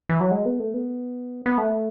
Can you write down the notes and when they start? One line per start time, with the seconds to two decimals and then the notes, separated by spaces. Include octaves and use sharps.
0.09 E3
0.20 F#3
0.31 G#3
0.45 B3
0.60 A3
0.74 B3
1.46 B3
1.58 A3